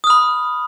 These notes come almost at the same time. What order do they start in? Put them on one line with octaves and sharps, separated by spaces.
D#6 F6 B5